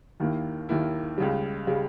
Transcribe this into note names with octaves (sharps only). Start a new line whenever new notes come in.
D#2 D#3 A#3 E4
D#2 D#3 A#3 E4
C#2 C#3 G3
C#3 G3